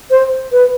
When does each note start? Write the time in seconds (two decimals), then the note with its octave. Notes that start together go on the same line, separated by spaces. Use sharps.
0.11 C5
0.53 B4